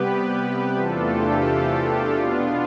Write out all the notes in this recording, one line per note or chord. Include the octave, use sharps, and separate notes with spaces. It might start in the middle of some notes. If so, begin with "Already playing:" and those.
Already playing: C3 G3 B3 G4 B4
E2 C3 E3 A3 D4 F4 A4
G4
B2 B3 D4 F4